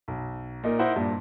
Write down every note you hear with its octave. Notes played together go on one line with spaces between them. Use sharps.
B1
A#2 D#4 A#4
D#4 E4 A#4 C5 D#5 F#5
G2 A#2